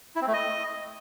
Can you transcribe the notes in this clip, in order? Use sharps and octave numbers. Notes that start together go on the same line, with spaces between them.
E4
C4
A3
D#5